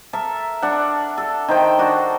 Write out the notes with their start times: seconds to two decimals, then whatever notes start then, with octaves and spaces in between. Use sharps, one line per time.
0.13 A4 A#4 E5
0.62 D4 F#5
1.18 A4
1.48 D#3 C5 G5
1.79 D4 F#4